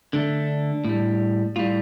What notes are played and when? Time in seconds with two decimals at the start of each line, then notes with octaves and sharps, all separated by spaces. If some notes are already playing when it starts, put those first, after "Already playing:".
0.13 D3 A3 D4
0.84 A2 G3
1.56 A2 G3 F4